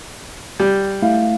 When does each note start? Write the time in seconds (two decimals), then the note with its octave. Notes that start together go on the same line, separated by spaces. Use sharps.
0.60 G3
1.02 A3 E4 F5